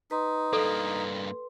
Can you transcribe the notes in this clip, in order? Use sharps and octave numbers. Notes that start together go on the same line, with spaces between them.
D#4 B4 C6
G2 A#3 A4